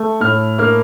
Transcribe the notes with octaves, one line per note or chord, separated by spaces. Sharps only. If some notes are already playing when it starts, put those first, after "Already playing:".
Already playing: A3
A2 F6
A#3 F6